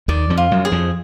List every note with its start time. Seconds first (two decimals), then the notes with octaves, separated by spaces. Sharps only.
0.08 D#2 D#3 D5
0.30 F2 F3
0.38 F4
0.51 F#2 F#3
0.65 G#4
0.72 F2 F3